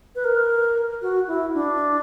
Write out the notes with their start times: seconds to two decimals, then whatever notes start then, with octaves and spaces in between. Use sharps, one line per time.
0.15 B4
0.24 A#4
1.02 F#4
1.28 E4
1.54 D4